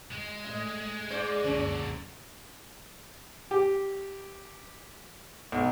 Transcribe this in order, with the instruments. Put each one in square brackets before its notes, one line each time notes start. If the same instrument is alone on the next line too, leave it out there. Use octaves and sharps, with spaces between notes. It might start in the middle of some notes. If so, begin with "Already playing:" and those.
[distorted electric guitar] G#3
[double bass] A2 [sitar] D#5
[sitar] G#2 C5 D5
[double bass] F#1 C#2 [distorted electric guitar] D3 F#3 [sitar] C#4
[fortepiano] G4
B1